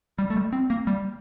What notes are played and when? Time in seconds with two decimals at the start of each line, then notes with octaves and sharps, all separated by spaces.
0.19 G3
0.30 A3
0.36 G3
0.53 C4
0.70 A#3
0.87 G3